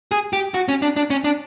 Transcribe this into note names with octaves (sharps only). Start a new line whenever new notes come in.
G#4
G4
F#4
C#4
D4
D4
C#4
D4